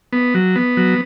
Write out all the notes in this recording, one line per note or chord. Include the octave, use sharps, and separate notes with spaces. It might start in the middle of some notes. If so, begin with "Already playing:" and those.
B3
F#3
B3
F#3